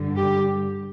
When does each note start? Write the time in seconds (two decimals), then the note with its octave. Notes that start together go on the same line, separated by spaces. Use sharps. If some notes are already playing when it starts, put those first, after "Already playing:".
Already playing: G2 D3 G3
0.17 G4